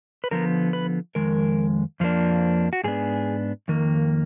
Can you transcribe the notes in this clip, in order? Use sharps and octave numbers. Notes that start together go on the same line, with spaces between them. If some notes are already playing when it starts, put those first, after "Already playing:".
B4
D3 F3 B3 A#4
B4
F2 D#3 G#3 A#4
F2 F3 A#3 D4
F#4
G#2 F#3 B3 D4 G#4
F2 D#3 A#3